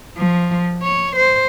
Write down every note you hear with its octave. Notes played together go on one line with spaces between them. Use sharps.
F3
C#5
C5